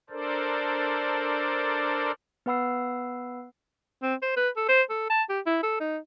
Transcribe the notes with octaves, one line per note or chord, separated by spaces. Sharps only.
D4 A4 A#4 C5 D5
B3 B4 F#5 B5 E6 C7
C4
C5
B4
A4
C5
A4
A5
G4
E4
A4
D#4